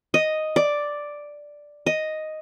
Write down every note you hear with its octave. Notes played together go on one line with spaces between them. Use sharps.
D#5
D5
D#5